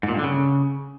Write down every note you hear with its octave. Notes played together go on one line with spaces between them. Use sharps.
G#2
A#2
G2
D3
C#3